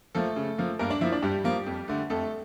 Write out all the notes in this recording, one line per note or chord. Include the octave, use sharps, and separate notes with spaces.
F3 A3 A#3 A4
C#3
F3 A#3
G2 A#3 A#4
D4 D5
F3 A#3 E4 E5
D4 D5
G2 G3 G4
F3 A#3
F2
D3 A3
F2 A3 A4